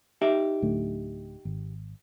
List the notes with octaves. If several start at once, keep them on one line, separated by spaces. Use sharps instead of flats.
D#4 G4 E5
D1 D3 A3
G#1